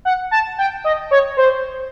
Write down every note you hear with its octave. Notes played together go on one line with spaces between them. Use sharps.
F#5
A5
G5
D#5
C#5
C5